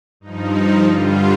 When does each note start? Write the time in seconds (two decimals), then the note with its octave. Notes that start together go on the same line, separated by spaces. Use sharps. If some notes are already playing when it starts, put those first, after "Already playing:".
0.20 G2 F3 D#4
0.83 G2 D3 G3 F4